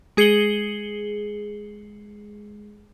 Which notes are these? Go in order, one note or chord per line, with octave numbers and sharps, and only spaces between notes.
G#3 G#4 C7 C#7 F#7 G7